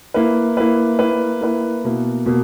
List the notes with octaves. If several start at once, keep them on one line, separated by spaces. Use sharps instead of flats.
A#3 E4 B4
A#3 E4 B4
A#3 E4 B4
A#3 E4 B4
B2 A#3 E4
B2 A#3